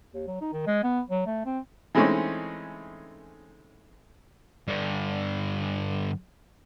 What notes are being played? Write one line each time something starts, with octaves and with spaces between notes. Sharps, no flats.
D#2
F#3
D#4
D#3
G#3
B3
F#3
A3
C4
E3 G#3 A3 C4 C#4 D#4
G2 D3